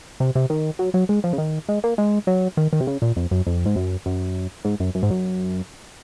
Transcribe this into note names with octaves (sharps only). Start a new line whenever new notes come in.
C3
C3
D#3
F#3
F#3
G#3
F3
C#3
D#3
G#3
A#3
G#3
F#3
D#3
D#3
C3
C#3
A#2
F2
F#2
F2
G#2
F#2
F#2
G#2
F#2
F#2
G#2
F#2